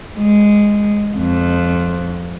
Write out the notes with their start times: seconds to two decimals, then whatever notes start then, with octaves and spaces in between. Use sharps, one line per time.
0.16 G#3
1.17 F2